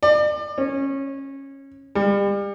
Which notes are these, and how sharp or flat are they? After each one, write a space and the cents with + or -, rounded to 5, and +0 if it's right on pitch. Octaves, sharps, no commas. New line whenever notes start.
D5 +35
C#4 -20
G3 +35